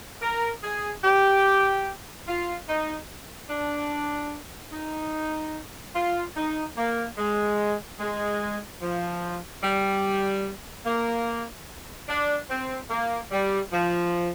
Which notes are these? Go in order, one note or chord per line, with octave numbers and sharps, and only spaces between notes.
A#4
G#4
G4
F4
D#4
D4
D#4
F4
D#4
A#3
G#3
G#3
F3
G3
A#3
D4
C4
A#3
G3
F3